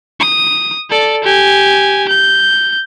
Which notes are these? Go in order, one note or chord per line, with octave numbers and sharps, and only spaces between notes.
D#6
A4 D5
G4 G#5
G6